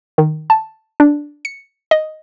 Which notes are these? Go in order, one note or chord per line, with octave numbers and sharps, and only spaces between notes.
D#3
A5
D4
C#7
D#5